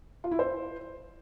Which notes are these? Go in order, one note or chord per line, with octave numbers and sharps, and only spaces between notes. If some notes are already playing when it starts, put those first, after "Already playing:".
F4
E4
C5